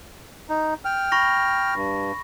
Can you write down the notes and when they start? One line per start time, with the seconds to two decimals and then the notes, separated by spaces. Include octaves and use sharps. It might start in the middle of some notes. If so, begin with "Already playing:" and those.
0.49 D#4
0.85 G5 F6
1.12 B5 C#6 A#6
1.75 G2